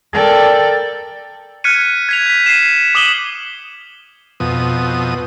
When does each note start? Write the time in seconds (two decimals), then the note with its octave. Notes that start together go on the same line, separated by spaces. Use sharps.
0.13 A4 A#4 D5 G5
1.64 F6 F#6 G#6 B6 C#7 D#7
2.09 G#6 B6 F7
2.26 G6 B6
2.46 C7 D#7 E7
2.95 D6 D#6 D#7 E7 F#7 G7
4.40 F2 B2 D#6